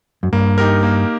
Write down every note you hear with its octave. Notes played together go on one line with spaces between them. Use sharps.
F#2
G2 A#3
D#4 G4 A#4
A#3